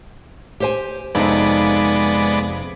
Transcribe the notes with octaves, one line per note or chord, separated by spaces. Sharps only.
G4 C5 G#5
F2 C3 G#3 B3 D#4 D5